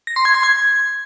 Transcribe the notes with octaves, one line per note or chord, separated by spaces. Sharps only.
A#6
C6
G#6
C6
G#6